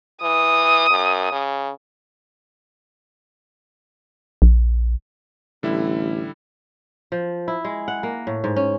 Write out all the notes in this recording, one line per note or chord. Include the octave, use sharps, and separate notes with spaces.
E3 D#6
F#2
C#3
A#1
A1 D3 G3 E4
F3
E4
G#3
F#5
A#3
A2
G#2
C#4